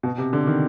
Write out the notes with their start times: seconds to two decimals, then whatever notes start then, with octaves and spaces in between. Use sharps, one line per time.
0.03 B2
0.18 C3
0.33 D3
0.47 D#3